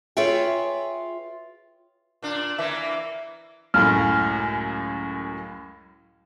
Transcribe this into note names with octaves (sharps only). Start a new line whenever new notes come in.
F4 G#4 B4 C#5 E5 G5
A#2 D4
E3 A#3 E5
C#2 F#2 A2 F6